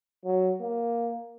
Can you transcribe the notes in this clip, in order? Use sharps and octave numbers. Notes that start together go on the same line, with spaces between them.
F#3
A#3